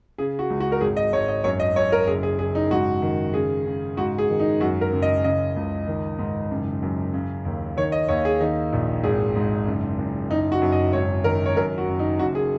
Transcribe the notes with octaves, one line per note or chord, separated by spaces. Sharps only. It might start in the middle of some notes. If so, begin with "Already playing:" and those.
C#3 G#4
F#4
C#2
F#4
A#4
G#1 G#4
D#5
G#1 C#5
D#5
F#2 C#5
D#5
F#2 C#5
A#4
F#1 G#4
G#4
F#1 G#4
D#4
G#2 F#4
D#3
C#3 G#4
C#3
G#2 F#4
G#4
D#3
D#4
F#2 F#4
A#4
F#1
D#5
C#3 D#5
C#2
D#3
G#2
F#1
F#2
C#3
D#2
D#3 C#5
D#5
D#2 C#5
G#4
D#3 D#4
A#1
G#1 G#4
G#2
F#1
F#1
F#1 D#4
F#4
F#2
D#5
G#1 C#5
D#3 A#4
C#5
F#2 A#4
F#4
F#1
D#4
F#1 F#4
G#4